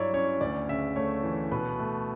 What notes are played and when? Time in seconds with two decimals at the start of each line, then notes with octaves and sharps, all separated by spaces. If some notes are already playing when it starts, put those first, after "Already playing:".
Already playing: G2 F#3 E4 C#5 D5 E5
0.13 C#4 C#5
0.41 D2 D5
0.69 C#3 E5
0.96 A3 C#5
1.24 E3
1.52 B2 B4
1.79 A3